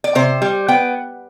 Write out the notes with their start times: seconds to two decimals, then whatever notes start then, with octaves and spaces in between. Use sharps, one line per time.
0.04 D5
0.15 C3 C5
0.42 G3
0.68 B3 G5